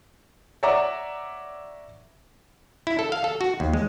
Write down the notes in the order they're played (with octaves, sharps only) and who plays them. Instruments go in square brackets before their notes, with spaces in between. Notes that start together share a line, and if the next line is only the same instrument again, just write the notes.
[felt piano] C#5 D5 E5 F#5 A#5 D6
[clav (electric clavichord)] E4
A4
F5
A4
F#4
D#2
G#3